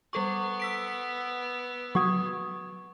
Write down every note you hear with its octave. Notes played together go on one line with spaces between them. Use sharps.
G3 B3 A4 C#6
E6 B6 D7
F#3 F#4 C#6 D#6 G#6